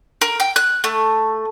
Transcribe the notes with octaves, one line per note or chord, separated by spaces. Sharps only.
A#4
G5
F#6
A3